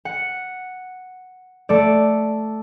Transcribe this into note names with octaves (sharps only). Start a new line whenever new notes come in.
F#5
A3 D5